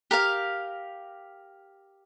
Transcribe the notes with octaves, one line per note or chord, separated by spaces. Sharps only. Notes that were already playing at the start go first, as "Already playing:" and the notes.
G4 A#4 F5